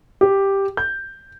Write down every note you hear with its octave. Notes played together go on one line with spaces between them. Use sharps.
G4
G6